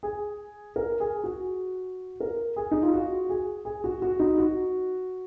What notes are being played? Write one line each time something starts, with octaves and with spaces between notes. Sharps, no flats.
G#4
A#4
G#4
F#4
A#4
G#4
D#4
F4
F#4
G#4
G#4
F#4
F#4
D#4
F#4